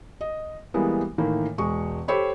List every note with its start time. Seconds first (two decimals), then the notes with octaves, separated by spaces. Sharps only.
0.21 D#5
0.74 E3 G3 G#3 A#3 B3
1.18 A2 D#3 E3 A#3
1.58 E1 G#3 C#6
2.08 G4 A4 C5 C#5 B5